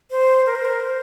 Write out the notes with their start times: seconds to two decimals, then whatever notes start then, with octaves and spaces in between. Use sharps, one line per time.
0.11 C5
0.46 A#4
0.55 C5
0.65 A#4
0.80 C5